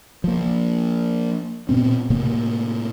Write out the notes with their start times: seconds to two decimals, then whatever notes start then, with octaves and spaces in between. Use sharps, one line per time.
0.24 F3 A#3
1.69 A#2 B3 C4
2.10 A2 C3 A#3